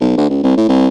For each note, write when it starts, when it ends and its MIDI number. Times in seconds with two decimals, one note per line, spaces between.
0.01 0.15 35
0.17 0.27 38
0.30 0.42 37
0.44 0.55 36
0.57 0.67 45
0.69 0.88 36